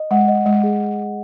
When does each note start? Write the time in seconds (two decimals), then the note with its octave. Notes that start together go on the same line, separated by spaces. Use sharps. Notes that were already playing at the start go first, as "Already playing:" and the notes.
Already playing: D#5
0.11 G#3 F#5
0.28 D#5
0.46 G#3 D#5
0.63 G#4